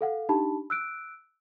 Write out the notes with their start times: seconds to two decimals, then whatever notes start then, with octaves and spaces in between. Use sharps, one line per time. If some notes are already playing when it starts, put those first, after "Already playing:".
0.01 A4 F5 F#5
0.29 D4 D#4 G4 A5 B5
0.70 E6 F#6 D7